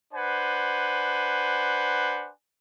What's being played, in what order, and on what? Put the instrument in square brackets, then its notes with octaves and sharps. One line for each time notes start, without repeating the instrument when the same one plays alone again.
[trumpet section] D4 B4 C5 F#5 G#5